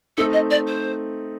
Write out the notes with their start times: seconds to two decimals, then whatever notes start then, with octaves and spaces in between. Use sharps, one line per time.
0.17 A3 C4 D#4 A4
0.33 D#5
0.51 D5
0.67 C5